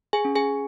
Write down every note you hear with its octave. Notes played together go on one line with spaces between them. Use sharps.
G#4 G#5
C#4
G#4 G#5